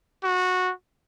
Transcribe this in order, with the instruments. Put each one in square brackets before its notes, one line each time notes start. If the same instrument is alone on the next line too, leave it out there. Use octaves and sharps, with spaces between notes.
[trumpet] F#4